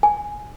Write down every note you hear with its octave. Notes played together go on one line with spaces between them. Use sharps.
G#5